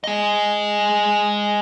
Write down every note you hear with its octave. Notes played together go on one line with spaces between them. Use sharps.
G#4 D#5